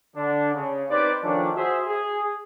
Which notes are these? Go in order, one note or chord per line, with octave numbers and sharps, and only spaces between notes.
D3 D4
C#3
C4 D#4 G4 B4 C5 D5
D#3 F3 A3 C#4 D4
F#4 G#4 C5 E5
G#4